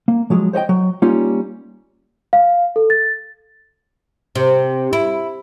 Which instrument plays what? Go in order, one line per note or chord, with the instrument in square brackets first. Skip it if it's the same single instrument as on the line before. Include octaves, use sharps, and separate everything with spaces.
[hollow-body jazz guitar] A#3
F3 F#3 G#3
C5 C#5 D#5 G5
F#3
G3 A#3 C#4 D#4 F4
[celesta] F5
A4
A6
[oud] C3
E4